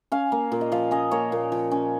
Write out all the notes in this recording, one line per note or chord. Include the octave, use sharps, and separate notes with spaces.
C#4 F5
A#3
A#2
D#5
F3 F5
C#4 D#5
A#3 C#5
A#2
F3
C#4